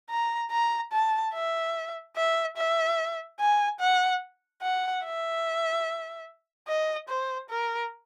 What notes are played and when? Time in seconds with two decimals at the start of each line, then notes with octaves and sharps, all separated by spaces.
0.10 A#5
0.51 A#5
0.92 A5
1.34 E5
2.16 E5
2.57 E5
3.40 G#5
3.80 F#5
4.63 F#5
5.04 E5
6.68 D#5
7.09 C5
7.50 A#4